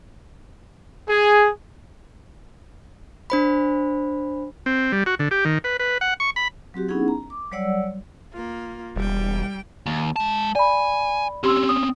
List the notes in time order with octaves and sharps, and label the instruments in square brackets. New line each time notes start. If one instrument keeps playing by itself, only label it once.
[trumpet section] G#4
[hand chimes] D4 C5 B5
[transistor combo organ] C4
G3
F#4
D3
G4
D#3
B4
B4
F#5
C#6
B5
[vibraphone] F#3 C4 F#4 G4
B3 C#4 D#4 E4 G#4 F#5
A#5
D6
F#3 G3 C#5 D5 F#5 E6
[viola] A#3 F4
[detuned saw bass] E1 [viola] G3 G5
[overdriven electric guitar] D#2
G#3 A5
[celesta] D5 B5 [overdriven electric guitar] G#5
[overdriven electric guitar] C4 C#4 [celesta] G4 C6 E6
[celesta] D#6